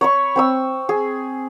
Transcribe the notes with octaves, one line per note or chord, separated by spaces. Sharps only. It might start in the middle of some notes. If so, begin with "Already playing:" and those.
C#5 B5 C#6
C4 C#6 E6
G#4